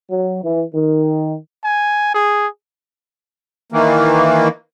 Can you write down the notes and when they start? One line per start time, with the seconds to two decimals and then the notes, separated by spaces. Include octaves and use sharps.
0.11 F#3
0.44 E3
0.74 D#3
1.64 G#5
2.14 G#4
3.72 D#3 E3 A#3